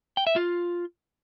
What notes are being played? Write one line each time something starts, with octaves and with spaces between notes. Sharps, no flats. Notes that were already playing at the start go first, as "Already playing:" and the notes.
G5
E5
F4